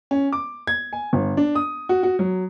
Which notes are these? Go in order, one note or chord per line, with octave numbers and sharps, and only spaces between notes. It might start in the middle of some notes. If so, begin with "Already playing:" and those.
C#4
D6
G#6
G#5
G1
D4
D#6
F#4
F#4
F#3